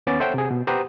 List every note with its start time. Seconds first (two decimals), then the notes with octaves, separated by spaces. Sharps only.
0.07 D#2 B3 C#4 D6 A6
0.20 A4 C5 C#5 E5 F#5 G5
0.34 C3 G#4
0.51 B2
0.67 G4 B4 C5 F#5 A#5 D#6